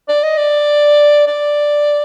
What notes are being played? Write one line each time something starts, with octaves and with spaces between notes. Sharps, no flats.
D5
D#5
D5
D5